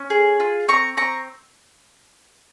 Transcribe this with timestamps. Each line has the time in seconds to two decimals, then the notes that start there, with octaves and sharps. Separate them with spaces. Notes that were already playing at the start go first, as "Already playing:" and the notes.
Already playing: C#4
0.10 G#4
0.40 F4
0.68 C4 A#5 C#6
0.97 C4 A#5 C#6